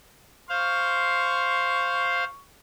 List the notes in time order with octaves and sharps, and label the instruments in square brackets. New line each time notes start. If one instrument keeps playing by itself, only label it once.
[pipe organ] C5 F5 [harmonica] C#6